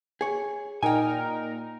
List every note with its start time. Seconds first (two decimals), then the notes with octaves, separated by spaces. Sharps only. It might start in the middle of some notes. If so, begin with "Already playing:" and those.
0.21 G#4 C#5
0.83 A#2 D#4 A#4 G5 G#5